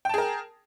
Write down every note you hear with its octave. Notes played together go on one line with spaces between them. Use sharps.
G#4 A#4 G5 A5